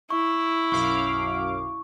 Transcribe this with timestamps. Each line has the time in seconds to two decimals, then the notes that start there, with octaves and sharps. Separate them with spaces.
0.10 E4 C#6
0.72 B1 F#2 F5 C#6 D6